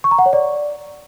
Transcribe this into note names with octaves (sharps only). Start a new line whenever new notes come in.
C#6
A#5
F#5
C#5
D5